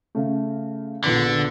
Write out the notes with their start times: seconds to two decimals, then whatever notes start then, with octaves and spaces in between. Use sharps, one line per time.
0.15 C#3 A3
1.04 A#1 D3 B3 B6